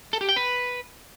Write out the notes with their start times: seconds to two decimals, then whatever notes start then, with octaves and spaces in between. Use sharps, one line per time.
0.13 A4
0.21 G4
0.29 G5
0.36 B4